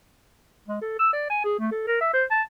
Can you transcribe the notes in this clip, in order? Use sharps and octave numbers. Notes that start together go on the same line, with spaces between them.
G#3
A4
E6
D5
G#5
G#4
A3
A4
A#4
E5
C5
A5